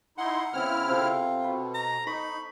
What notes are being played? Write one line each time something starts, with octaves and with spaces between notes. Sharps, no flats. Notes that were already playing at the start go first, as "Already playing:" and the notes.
D#4 E4 F#5 C6
C#3 B3 C4 E4 F6
C3 F4 A4
B2 B5
A#5
D#4 B5 C#6